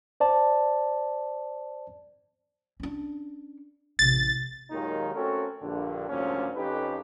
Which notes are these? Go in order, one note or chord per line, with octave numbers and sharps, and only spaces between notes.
C5 D5 A5
C#4 D4
A1 C3 A6
D#2 A#2 D#3 F#3 G#3 D#4
A3 C4 C#4 F#4 A4 A#4
A#1 G2 D3
G#1 D2 G2 A#2 F3 C#4
F2 C#4 D#4 G4 A4 B4